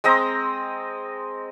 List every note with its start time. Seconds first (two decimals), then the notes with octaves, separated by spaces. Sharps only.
0.04 G#3 C4 D#5 A#5